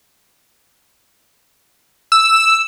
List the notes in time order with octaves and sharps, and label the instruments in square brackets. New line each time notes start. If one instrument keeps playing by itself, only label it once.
[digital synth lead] E6